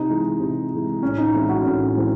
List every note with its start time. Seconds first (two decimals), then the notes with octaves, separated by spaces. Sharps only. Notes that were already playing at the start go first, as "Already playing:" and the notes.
Already playing: C3 D#4
0.09 E3 G#3
0.40 C3
0.71 E3 G#3
1.02 A2 C#4
1.18 D#4
1.33 E3 G#3 C4 E4
1.49 F#4
1.64 A2 C#4
1.95 E3 G#3 C4